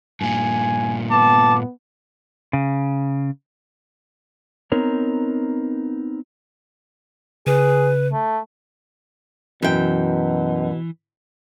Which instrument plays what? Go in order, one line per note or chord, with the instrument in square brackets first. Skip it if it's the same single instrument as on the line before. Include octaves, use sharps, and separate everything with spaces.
[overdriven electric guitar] G2 A#2 [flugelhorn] G#5
[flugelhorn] B3 [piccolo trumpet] A5 [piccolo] D6
[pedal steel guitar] C#3
[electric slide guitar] B3 C4 D#4 A#4 C#5
[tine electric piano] C#3 [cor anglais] G#4 [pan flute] B4
[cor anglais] A3
[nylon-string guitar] F#2 G5 [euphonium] B2 [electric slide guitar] E3